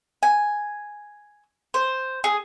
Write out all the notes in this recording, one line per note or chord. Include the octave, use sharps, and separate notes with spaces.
G#5
C5
G#4